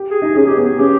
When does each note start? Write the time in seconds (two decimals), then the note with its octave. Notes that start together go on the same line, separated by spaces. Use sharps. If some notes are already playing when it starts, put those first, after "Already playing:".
Already playing: G4
0.11 G#4
0.22 D#4
0.36 C#4 G#4
0.48 G4
0.57 B3 G#4
0.79 C#4 G4